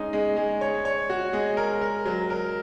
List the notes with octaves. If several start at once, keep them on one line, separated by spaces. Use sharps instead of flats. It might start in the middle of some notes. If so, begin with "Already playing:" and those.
Already playing: G#3 C#4 D#4
G#3
G#3
C#5
C#5
F#4
G#3
A#4
A#4
F#3
A#4